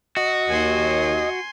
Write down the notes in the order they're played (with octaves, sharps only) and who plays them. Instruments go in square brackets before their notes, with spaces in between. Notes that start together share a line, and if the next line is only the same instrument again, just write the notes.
[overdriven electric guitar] F#4 [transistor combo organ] D#5
[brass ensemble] D#2 [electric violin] G#5 C6